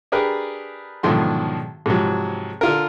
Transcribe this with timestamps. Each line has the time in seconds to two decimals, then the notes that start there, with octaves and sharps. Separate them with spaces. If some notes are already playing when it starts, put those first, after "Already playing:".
0.12 D4 G4 G#4 A#4 B4
1.03 B1 G#2 D3 D#3 F3 C6
1.86 G#2 C3 F3 F#3
2.61 D3 F4 A#4